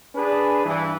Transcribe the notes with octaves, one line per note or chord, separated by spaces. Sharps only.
D4 G#4 B4
G2 E3